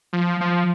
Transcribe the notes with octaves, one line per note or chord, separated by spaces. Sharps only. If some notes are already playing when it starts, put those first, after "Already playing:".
F3
F3